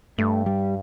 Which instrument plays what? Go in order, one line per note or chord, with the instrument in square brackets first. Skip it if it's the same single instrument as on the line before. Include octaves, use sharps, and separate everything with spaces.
[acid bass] G2 [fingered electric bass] A3
[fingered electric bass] G3